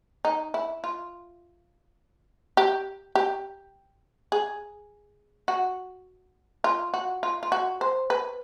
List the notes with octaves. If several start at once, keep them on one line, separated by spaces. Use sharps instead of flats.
D#4
E4
F4
G4
G4
G#4
F#4
F4
F#4
F4
F4
F#4
C5
B4